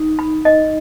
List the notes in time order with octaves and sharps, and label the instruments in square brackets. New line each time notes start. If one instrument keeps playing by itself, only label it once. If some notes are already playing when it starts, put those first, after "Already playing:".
Already playing: [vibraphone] D#4
[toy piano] B5
D#5